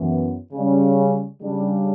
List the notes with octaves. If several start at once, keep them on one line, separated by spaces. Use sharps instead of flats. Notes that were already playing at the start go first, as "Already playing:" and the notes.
Already playing: F#2 E3 B3
C#3 G3 C#4
C#3 G3 D4